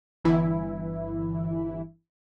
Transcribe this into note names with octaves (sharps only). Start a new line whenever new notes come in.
G1 E3 E4